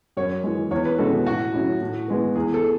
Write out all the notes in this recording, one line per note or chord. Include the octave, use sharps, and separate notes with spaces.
F#2 C#5
E3 G#3
E2 C#5
B4
B2 G#3 C#4 F#4 A4
A2 F#4
F#3 C#4 E4
A2
E3 G#3 B3
E2 G#4
A4
G#4